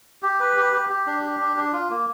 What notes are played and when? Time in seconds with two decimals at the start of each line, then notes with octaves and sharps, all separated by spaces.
0.23 G4
0.40 B4
0.56 G4
0.73 G4
0.90 G4
1.06 D4
1.23 G4
1.40 D4
1.57 D4
1.73 F4
1.90 A#3